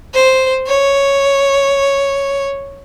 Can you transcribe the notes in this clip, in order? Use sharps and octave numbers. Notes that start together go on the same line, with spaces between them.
C5
C#5